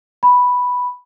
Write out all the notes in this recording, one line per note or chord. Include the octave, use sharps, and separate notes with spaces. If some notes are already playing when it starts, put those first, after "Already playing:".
B5